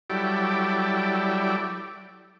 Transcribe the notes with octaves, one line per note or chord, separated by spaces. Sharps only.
F#3 G3 E4 G4 A4 D5